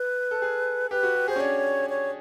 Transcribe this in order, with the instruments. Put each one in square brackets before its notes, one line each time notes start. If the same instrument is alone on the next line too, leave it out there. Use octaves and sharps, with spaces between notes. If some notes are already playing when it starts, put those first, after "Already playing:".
Already playing: [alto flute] B4
[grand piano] A4
G#4
[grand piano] G4 [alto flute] B4
[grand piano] F#4
G4
[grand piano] G#4 [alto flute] C5
[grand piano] C#4
[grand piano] D4 [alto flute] C#5
[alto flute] C#5